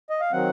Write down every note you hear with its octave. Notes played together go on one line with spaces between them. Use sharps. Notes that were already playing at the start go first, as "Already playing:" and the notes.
D#5
F5
D#3 F#3 C4 F#5